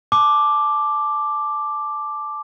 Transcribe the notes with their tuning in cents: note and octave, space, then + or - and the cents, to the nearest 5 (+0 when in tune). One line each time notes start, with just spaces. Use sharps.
A5 -25 D6 +5